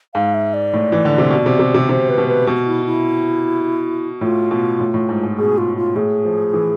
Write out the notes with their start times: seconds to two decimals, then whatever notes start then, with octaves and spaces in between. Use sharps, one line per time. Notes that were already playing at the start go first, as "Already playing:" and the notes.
0.14 G#2 F5
0.34 E5
0.54 D5
0.73 A2
0.92 E3
1.05 D3
1.18 C3
1.30 B2
1.46 C3
1.59 C3
1.74 C3
1.89 C3 C5
2.09 B4
2.18 B2
2.28 B4
2.47 B2
2.66 E4
2.86 E4
4.21 A2 F4
4.51 B2
4.80 A2
4.94 A2
5.09 G#2
5.23 G#2
5.38 B2 G#4
5.58 F4
5.77 F4
5.96 A2 G#4
6.25 F3
6.54 E3